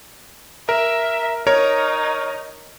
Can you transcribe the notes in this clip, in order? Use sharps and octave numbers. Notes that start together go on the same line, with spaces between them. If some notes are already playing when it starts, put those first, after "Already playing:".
A#4 E5
D#4 A#4 C#5 C#6